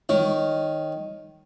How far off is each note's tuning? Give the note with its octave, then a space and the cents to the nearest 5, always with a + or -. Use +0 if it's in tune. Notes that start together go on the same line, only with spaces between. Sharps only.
D#3 +0 C#5 +0